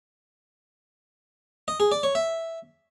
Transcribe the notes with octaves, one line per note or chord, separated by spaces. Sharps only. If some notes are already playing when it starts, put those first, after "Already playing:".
D#5
G#4
D5
C#5
E5